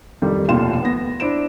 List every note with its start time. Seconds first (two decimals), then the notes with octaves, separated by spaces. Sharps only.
0.22 F2 D#3 G3
0.48 F1 D#2 B2 F4 C6 E7
0.83 B3 A#6
1.20 D4 E4 C5 D7 E7